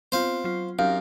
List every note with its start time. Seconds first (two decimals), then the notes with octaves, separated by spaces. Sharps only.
0.12 B3 C4 F4 C5 F5
0.44 F#3 F4
0.79 F#2 C4 D#4 G4 F5